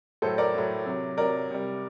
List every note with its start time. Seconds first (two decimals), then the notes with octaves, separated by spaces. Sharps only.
0.22 A2 F#3 A4 C5
0.38 A#4 D5
0.54 A2 F#3
0.86 C3 F#3
1.18 C3 F#3 A#4 D5
1.50 C3 G3